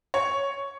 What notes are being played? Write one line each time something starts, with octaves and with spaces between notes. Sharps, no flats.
C#5